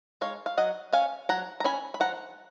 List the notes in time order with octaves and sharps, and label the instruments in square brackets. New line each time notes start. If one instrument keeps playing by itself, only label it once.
[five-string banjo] G#3 D#4 C#5 F5
F5
F#3 D#5 F#5
C#4 F5 G#5
F#3 F#5 A#5
A#5
C#4 G#5 B5
B5
F3 F#5 A#5